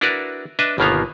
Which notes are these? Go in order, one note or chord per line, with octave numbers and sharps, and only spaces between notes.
D4 E4 F#4 A#4 B4 D5
D4 B4 D#5 E5
G1 B2 D#3 A#3 B3 F5